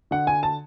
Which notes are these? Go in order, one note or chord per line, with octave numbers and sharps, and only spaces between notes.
D3 F#5
G#5
A5